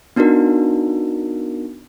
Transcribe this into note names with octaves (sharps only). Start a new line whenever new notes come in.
B3 D4 D#4 F#4 A#4